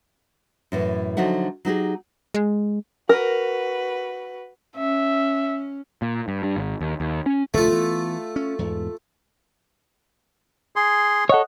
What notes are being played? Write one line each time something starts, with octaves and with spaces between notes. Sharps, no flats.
F#2 A2 E3
D3 F3 F#3 D#4 E5 F#5
F#3 D#4 G4 G#4
G#3
F#4 A#4 B4
C#4 E5
A#2
G2
G2
G#1
D#2
D#2
C#4
F1 D2 A#2 A3 F4
E3 B3
C#4
E2 G#2
G#4 C6
A4 C#5 D#5 F#5